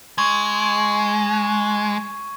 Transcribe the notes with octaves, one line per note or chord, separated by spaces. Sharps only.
G#3 C#6 G#6